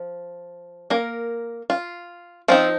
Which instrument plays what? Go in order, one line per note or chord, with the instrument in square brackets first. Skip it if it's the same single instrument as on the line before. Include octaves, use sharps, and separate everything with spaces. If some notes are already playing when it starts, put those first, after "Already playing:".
Already playing: [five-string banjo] F3
A#3 A#4
F4
F3 C4 D#4 F4